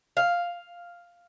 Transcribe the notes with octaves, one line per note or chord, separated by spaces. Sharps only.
F5